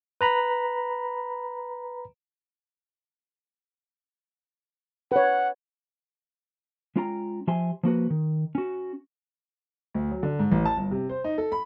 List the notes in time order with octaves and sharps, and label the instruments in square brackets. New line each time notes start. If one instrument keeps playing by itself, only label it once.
[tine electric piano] B4 A#5 B5
[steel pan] B4 C#5 [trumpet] F#5
[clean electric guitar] G#3 C#4 F4 G5 A5 A#5
F3 G4 E5 G#5 C6
F3 A#3 F#4 B4
D#3
C#4 F#4
[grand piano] D2
F#3
D3
G#2
A1
A5
G1
C3
C5
D#4
A4
B5